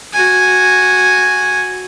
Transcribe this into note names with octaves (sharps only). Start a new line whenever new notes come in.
F#4 G#5